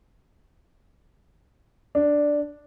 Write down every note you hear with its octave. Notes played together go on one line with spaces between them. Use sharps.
D4